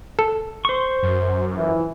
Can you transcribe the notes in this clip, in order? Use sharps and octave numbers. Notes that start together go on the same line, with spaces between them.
A4
C5 C#6
F#2
E3 F3 E4